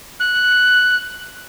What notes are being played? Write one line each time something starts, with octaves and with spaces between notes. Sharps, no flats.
F#6